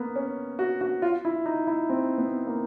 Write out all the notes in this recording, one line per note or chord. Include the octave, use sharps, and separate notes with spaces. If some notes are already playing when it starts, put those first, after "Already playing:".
Already playing: A#3 B3
C#4
F#4
F#4
F4
E4
D#4
E4
C4
B3
A#3